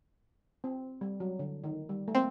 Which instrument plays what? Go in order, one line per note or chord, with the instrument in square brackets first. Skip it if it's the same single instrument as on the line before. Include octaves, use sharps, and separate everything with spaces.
[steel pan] C4
G3
F#3
D3
D#3
G3
A3
[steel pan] A#3 [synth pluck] C4